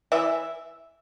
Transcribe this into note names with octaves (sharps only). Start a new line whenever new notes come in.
E3 E5